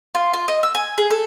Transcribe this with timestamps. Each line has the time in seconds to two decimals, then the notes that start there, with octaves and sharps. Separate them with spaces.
0.15 F4
0.33 F4
0.48 D#5
0.63 E6
0.75 G#5
0.98 G#4
1.10 A4